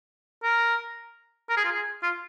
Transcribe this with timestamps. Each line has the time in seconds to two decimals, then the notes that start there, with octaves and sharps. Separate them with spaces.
0.43 A#4
1.50 A#4
1.57 G#4
1.65 F4
1.71 G#4
2.03 F4